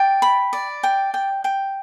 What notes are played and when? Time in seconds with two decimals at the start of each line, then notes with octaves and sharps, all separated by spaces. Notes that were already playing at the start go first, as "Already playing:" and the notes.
Already playing: D5 G5
0.22 B5
0.53 D5
0.83 G5
1.14 G5
1.44 G5